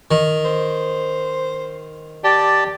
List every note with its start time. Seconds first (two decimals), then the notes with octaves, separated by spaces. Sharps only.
0.11 D#3
0.45 C5
2.24 G4 D5 A5